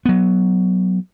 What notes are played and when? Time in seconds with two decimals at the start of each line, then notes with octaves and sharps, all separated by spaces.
0.05 F#3 B3